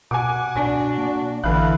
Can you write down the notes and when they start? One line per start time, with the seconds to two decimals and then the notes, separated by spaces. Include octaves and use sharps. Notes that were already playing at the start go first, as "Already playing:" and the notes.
0.11 B2 F#5 G#5 D6
0.55 D4 F#4
0.98 A#3
1.44 A1 D3 E3 E4 F5 F#6